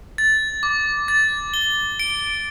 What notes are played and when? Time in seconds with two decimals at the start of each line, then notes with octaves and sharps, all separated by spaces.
0.18 A6
0.63 D6
1.08 A6
1.54 G7
2.00 D7